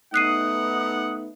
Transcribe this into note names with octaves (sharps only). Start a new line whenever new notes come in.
A3 B3 D#4 F#5 D#6 F#6 C7 D#7